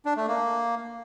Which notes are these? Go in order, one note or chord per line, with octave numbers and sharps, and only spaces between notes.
D4
A3
A#3